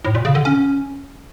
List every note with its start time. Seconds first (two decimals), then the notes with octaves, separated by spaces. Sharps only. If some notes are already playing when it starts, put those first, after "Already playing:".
0.05 A2
0.15 A#2
0.25 C#3
0.35 D3
0.45 C#4